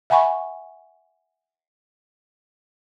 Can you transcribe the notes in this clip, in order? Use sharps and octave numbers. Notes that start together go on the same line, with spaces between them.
E5 F#5 G#5 B5 C#6